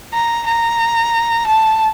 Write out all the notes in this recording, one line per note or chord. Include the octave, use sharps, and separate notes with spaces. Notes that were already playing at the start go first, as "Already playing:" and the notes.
A#5
A#5
A5